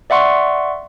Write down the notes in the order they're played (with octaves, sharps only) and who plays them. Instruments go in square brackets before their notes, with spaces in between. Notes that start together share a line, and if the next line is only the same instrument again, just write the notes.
[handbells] D5 E5 F#5 C6 C#6